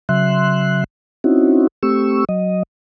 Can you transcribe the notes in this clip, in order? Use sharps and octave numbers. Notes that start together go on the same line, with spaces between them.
C#3 F#3 E5 C6 F#6
C4 C#4 D#4 E4 F#4
A3 C4 G4 C#6 E6
F#3 D#5